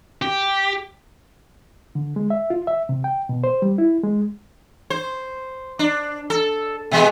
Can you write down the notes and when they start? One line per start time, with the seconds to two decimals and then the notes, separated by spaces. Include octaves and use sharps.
0.22 G4
1.95 D3
2.16 G#3
2.30 E5
2.50 F4
2.67 E5
2.89 C3
3.04 G5
3.29 B2
3.44 C5
3.62 G3
3.78 E4
4.03 G#3
4.90 C5
5.79 D4
6.30 A4
6.91 B2 G#3 B3